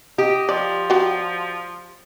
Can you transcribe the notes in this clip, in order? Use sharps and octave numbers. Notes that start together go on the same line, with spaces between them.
G4 D#5
F3 D5
F#3 G3